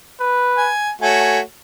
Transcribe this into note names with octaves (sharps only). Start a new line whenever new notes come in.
B4
G#5
A3 F#4 C#5 G#5